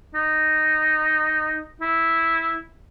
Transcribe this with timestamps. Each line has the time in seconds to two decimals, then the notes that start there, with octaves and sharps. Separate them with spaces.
0.15 D#4
1.81 E4